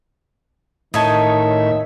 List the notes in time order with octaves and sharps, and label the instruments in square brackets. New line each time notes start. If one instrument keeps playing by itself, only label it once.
[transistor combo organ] A2 E5 [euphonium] D#3 [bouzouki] D#4 C#5 A5